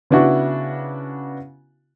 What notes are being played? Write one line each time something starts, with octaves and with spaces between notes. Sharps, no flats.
C#3 B3 D4 E4 F#4